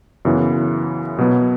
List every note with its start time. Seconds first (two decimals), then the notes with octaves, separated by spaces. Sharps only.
0.25 F#2 C#3 E3 B3 E4
1.18 B2 F#3 B3